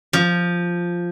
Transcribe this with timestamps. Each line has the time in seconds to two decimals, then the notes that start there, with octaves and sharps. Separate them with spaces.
0.13 F3